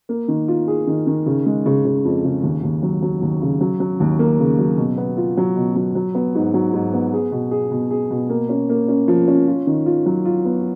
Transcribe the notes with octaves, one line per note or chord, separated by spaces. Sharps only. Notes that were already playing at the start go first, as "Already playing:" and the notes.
A#3
D#3
F4
G#4
D#3
D#3
C#3
G#3
C#3
C#3
F2
C#3
D#2
D#2
F#3
F#3
D#2
C#3
F#3
F#3
D#2
A#3
C#3
F#3
B2
B3
F4
F#3
B2
F#3
F#3
B3
G#2
F#3
G#2
B3
G#4
B2
G#4
B2
G#4
B2
A#3
C#4
A#3
C#4
F3
C#4
F4
D#3
F4
F#3
F4
B3